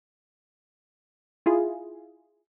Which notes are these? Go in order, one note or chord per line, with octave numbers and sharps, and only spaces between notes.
E4 F4 G#4